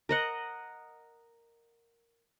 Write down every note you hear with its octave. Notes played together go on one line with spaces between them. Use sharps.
A#4 D#5 F#5